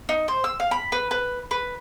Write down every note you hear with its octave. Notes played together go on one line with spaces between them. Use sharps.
D#4
C5
E6
F5
B5
B4
B4
B4